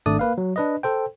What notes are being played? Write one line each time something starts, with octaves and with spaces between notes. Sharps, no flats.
G#1 A3 D4 D5 D#6
A#3 B4 F5
F#3
D4 B4 D#5
A4 C5 G5